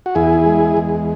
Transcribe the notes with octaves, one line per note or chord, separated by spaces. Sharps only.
F#4
E2 E4 G#4
G#3
E2